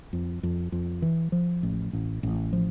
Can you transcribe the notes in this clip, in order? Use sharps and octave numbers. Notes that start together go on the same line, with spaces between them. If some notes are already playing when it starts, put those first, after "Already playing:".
F2
F2
F2
E3
F3
A1
A1
A1
F3